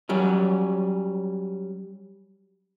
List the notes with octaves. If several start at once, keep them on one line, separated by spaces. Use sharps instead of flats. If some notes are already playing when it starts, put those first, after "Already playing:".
F#3 G3 C#4